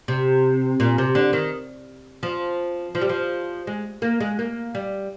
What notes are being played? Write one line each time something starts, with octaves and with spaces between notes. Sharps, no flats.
C3
A#2
C3
D3
D#3
F3
F3
G3
F3
G#3
A#3
G#3
A#3
G3